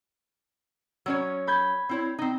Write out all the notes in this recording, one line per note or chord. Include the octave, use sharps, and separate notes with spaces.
F#3 C#4 C#5
B5 G6 G#6
C4 E4 C#5
C4 D#4